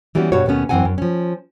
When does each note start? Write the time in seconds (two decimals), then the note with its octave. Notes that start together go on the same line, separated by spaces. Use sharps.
0.15 E3 G3 B3 C#4 E4 F#4
0.32 G2 B2 F#4 G4 C#5
0.46 D#2 B2 A3 B3 C#4
0.69 F#2 E3 F3 C4 F#5 G#5
0.85 F#2
0.98 F3 C#4